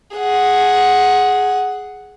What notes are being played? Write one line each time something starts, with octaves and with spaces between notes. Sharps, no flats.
G#4 F#5